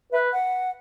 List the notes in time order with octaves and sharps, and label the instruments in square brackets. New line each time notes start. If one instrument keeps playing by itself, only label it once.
[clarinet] B4 [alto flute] E5
[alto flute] F#5